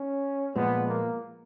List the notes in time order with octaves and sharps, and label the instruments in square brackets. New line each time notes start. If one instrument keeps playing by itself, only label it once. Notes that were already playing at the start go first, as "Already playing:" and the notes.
Already playing: [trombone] C#4
[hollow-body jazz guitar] A#2 F3 G#3 [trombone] B3
[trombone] A#3